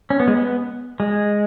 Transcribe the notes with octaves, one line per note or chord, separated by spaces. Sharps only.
C#4
B3
G#3
B3
G#3